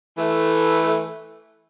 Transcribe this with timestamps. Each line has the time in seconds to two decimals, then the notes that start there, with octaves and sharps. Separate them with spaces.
0.17 E3 A3